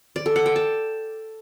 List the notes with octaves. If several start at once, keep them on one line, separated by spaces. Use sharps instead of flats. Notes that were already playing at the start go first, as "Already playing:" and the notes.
D5
A4
F#5
G5
A5